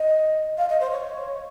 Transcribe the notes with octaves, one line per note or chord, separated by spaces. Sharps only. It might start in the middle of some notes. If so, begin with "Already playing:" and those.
Already playing: D#5
F5
D#5
C5
C#5